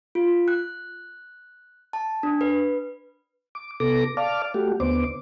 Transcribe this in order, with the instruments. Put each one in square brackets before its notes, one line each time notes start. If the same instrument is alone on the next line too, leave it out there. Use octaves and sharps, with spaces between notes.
[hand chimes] F4
F#6
A5
D4
B4
[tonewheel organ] D6
C3 B3 A4 D6 A#6
D5 F5 A5 D6 F6
A3 F#4 G4
D#2 D3 B3 C5 D6